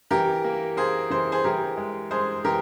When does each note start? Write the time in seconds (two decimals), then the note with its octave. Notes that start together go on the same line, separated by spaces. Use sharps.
0.11 E3 G4 A#4
0.44 A#3
0.77 A#3 G#4 C5
1.10 E3 C5
1.32 G#4 C5
1.44 E3 G4 A#4
1.77 G#3
2.11 G#3 G#4 C5
2.44 E3 G4 A#4